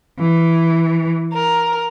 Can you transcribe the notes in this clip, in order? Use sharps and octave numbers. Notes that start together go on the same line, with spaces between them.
E3
A#4